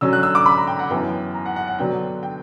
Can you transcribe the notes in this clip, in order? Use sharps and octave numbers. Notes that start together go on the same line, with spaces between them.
D3 F#3 C#4 E6
F#6
E6
D6
B5
A#5
G5
F#5
F#2 E3 B3 G5
A#5
F#5
F#5
F#5
D3 F#3 B3 D4 G5
G5